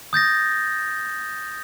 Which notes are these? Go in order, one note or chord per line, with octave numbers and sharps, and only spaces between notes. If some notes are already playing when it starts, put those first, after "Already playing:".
D#6 G6 A6 A#6